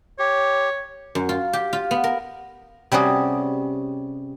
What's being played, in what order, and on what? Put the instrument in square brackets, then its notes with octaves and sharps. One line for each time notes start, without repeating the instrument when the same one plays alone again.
[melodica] G4 [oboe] C#5
[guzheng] F#2
F4
G4
F4
B3
A#4
C3 G3 C#4 F#4 G#4